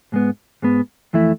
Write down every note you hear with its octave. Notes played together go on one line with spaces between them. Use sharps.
G#2 G#3 B3
G#2 G#3 B3
F2 E3 A3 E4